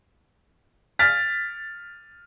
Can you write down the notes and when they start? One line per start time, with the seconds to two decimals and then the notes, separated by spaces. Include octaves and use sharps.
0.99 F6 A6 B6